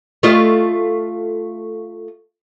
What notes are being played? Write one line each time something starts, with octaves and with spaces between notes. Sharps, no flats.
A3 F4 D#5